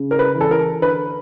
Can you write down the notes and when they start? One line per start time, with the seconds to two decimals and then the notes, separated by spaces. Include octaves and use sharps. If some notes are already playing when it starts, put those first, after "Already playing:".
Already playing: C#3
0.11 A#4
0.19 B4
0.35 E3
0.41 A4
0.51 A#4
0.82 D3 B4